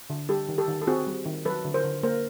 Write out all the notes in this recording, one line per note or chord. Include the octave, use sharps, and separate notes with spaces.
D3
G3 G4 A4
D#3
G4 A4
D#3
A4
C4 F#4 G#4
G3
D#3
F#3 A4 B4
D3
A#4 C5
D3
A#3 A#4 C5